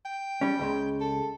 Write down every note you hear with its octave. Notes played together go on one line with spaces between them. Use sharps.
G5
G3 C#4
C#2 C#3 G#3
A4